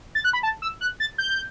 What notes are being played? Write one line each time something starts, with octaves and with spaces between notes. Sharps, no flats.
A6
F#6
B5
A5
E6
F#6
A6
G6